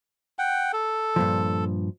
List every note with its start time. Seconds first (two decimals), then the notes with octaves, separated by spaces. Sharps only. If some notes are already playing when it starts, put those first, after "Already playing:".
0.39 F#5 G5
0.73 A4
1.16 G2 A#2 F3